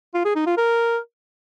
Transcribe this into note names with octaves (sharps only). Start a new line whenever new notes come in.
F4
G#4
D#4
F4
A#4